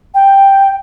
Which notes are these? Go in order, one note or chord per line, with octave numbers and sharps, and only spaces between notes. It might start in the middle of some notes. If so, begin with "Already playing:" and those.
G5